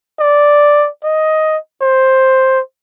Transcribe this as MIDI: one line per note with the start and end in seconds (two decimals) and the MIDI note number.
0.20 0.88 74
1.04 1.57 75
1.82 2.60 72